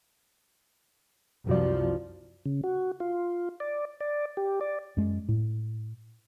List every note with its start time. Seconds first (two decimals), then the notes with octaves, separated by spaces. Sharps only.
1.47 C2 F#2 F3 F#4 D5
2.46 C#3
2.64 F#4
3.00 F4
3.60 D5
4.00 D5
4.37 G4
4.61 D5
4.97 F#2 G#3
5.29 A2